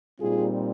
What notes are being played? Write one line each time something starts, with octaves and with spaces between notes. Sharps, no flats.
A#2 G3 C4 D#4 F4 G#4